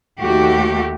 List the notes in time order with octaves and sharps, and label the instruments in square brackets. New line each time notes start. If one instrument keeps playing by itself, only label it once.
[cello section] D#2 A3 F#4 G4